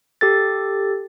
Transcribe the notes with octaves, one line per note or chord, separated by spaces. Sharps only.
G4 A4 A6